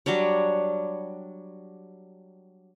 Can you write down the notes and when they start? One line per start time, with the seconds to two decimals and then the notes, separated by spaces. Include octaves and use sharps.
0.06 F#3 G3 D4 C#5